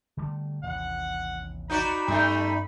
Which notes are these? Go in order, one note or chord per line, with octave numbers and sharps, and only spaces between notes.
D3 G3 A3
A1 D#2 C3 F#5
D#4 F#4 D5 B5
G2 G3 A3 B3 C#4 D#4